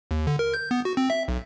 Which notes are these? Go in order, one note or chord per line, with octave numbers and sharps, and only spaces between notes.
D#2
D3
A#4
G6
B3
F#4
C4
E5
B1